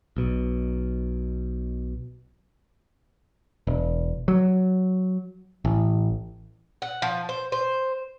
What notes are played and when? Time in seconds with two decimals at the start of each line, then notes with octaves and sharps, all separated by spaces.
0.17 B1 B2
3.67 E1
4.28 F#3
5.65 A1
6.82 F#5
7.02 F3
7.29 C5
7.52 C5